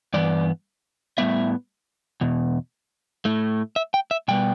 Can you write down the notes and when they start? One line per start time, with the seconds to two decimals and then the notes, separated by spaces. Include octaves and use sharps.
0.14 G2 E3 B3 D5
1.18 A2 G3 B3 E5
2.21 E2 B2
3.25 A2 A3
3.76 E5
3.94 G5
4.11 E5
4.28 B2 G3 B3 G5